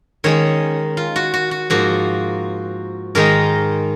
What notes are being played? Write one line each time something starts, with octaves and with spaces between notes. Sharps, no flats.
D#3 G#3 C#4 C#5
F4
F#4
F#4
F#4
G#2 F3 A#3 F#4
G#2 D#3 G#3 D#4 A#4